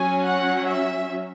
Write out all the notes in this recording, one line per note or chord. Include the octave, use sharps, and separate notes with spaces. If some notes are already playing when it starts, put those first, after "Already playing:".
Already playing: F#3 C#4 G#5
F#5
E5